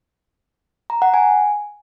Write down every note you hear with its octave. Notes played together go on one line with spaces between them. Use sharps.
A#5
F#5
G#5